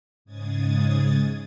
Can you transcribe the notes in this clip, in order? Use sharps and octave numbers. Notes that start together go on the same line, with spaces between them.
G#2 C#3 G#3 D#6 G#6 A6